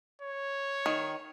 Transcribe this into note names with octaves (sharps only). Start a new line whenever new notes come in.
C#5
D#3